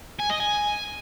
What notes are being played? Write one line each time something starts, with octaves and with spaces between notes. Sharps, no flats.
G#5
D#5
G#5